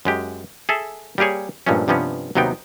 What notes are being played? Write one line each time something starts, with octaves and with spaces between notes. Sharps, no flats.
F#2 G#3 G4
G#4 A4 E5
G3 A#3 G4 G#4 C#5
G2 A#2 F3 G#3 A3 C#4
G2 C3 F3 B3 C#4
D#2 C3 F#3 B3 D#4 G5